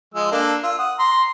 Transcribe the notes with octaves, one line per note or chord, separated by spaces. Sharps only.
F3 G#3 E6
A#3 D4 A4
F4 E6
F#5 D#6
A#5 C6